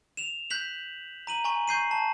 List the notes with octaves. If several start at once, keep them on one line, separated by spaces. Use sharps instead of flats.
E7 F7
F#6 G6 B6 F#7
A#5 D#7 F#7
G#5 A#5 C#6
C#6 G6 C7 D#7
A5